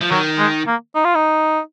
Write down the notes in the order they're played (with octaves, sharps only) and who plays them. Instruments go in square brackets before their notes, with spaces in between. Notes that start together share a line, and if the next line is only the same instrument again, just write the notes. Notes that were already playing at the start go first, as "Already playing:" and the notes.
[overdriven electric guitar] F3
[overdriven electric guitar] D#3 [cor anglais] F#3
[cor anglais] G#3
A#3
D#4
F4
D#4